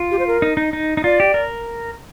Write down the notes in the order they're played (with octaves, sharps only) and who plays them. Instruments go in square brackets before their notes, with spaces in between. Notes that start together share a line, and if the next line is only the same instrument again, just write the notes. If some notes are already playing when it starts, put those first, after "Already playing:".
Already playing: [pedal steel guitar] F4
[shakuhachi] G4
C5
A#4
[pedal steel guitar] D#4
D#4
D#4
D#4
[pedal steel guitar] F4 [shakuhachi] D5
[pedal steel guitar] G4
A#4